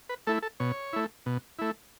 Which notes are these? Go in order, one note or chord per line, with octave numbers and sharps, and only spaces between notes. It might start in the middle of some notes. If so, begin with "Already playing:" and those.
B4
A3 E4 A4
A4
B2 C#5
A3 E4
B2
A3 E4